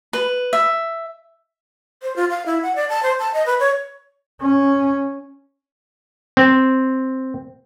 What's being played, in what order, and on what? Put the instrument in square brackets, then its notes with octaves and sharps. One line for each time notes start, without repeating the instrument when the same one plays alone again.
[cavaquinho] B4
E5
[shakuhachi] C5
F4
F5
E4
F#5
D5
A5
C5
A5
D#5
B4
C#5
[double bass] C#4
[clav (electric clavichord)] C4